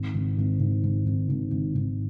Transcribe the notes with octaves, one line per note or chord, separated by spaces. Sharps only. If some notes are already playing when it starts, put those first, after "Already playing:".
Already playing: G#1
G#1
G#1
G#1
G#1
G#1
G#1
G#1
G#1